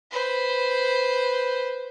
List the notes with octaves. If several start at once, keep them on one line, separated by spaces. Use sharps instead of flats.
B4 C5